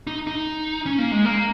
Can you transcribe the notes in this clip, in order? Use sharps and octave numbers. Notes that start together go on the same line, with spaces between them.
D#4
D#4
C#4
A#3
G#3
A#3